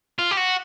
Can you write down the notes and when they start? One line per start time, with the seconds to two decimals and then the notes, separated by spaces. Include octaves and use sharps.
0.19 F4
0.31 G4
0.37 F#4